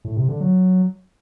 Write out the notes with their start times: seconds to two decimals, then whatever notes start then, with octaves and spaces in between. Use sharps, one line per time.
0.05 A2
0.17 C3
0.29 D3
0.40 F#3